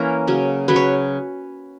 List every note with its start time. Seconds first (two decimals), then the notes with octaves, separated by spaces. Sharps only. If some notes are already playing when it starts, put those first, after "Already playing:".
Already playing: E3 A#3 C#4 A#4 C#5
0.27 C#3 F#3 C#4
0.68 C#3 F#3 C#4 B4
0.76 C#5